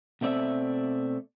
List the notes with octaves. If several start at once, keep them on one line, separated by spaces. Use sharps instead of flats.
B2 A3 C4 D5 E5